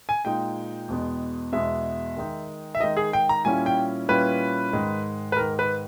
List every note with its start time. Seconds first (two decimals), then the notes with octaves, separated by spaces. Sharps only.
0.09 G#5
0.25 A#2 G#3 D#4 G5
0.88 E2 B2 G#3 B3
1.52 E2 B2 G#3 B3 E5
2.17 D#3 G#3 D#4
2.75 E5
2.80 D#3 G#3 D#4 D#5
2.97 G#4
3.13 G5
3.29 A#5
3.45 A#2 G3 C#4 E4 G#5
3.66 G5
4.09 A#2 G3 C#4 E4 B4
4.73 G#2 D#3 G#3
5.32 B4
5.37 G#2 D#3 G#3 A#4
5.59 B4